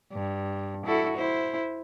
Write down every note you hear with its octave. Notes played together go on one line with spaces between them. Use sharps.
G2
E4 F#4 A4
E4 C5